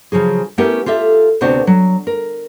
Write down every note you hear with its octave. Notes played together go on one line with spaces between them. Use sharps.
C#3 F3 F#3 G#4
A3 B3 C#4 E4 G4 A#4
F4 G4 A4 E5
D2 C3 B3 D4 F#4 C5
F#3
A#4